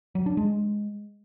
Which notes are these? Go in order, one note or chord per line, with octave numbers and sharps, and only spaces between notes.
F#3
D4
G#3